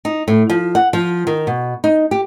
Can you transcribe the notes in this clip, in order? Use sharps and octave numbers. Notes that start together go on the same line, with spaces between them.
D#4
A2
F3
F#5
F3
D#3
B2
D#4
G4